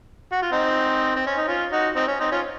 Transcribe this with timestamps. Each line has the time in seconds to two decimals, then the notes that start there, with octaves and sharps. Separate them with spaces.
0.32 F#4
0.42 F4
0.52 C4 D#4
1.16 C4
1.27 C#4
1.37 D#4
1.47 C#4 F4
1.72 D#4 F#4
1.96 C4 D#4
2.08 C#4
2.20 C4 D#4
2.32 C#4 F4